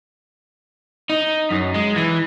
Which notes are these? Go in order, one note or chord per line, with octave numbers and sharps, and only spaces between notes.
D#4
F#2
G#3
E3